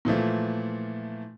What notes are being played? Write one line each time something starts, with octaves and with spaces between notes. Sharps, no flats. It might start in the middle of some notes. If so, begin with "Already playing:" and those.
A#2 E3 F3 A3